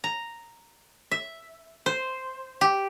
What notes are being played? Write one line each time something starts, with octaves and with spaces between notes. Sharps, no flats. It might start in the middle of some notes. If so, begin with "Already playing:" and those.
A#5
E5
C5
G4